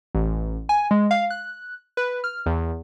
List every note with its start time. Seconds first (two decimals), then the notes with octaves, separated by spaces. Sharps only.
0.15 A1
0.69 G#5
0.91 G#3
1.11 F5
1.30 F#6
1.97 B4
2.24 F6
2.46 E2